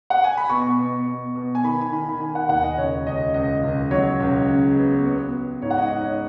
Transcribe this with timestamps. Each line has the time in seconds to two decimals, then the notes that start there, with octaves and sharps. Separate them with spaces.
0.10 F#5
0.24 G#5
0.37 B5
0.49 B2 C#6
0.79 B2
1.06 B2
1.35 B2
1.55 G#5
1.64 D#3 B5
1.81 G#5
1.92 D#3 B5
2.09 B5
2.20 D#3 G#5
2.35 F#5
2.49 D#2 F#5
2.63 D#5
2.77 C#2 C#5
3.07 C#2 D#5
3.34 C#2 D#5
3.64 C#2
3.91 F#3 C#5
4.20 C#2
4.48 C#3
4.77 B3
5.05 B3
5.33 B3
5.62 G#2 C#5
5.70 F#5
5.77 D#5
5.90 G#2 D#5
6.04 C#5